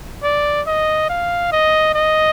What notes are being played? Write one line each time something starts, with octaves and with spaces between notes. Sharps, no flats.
D5
D#5
F5
D#5
D#5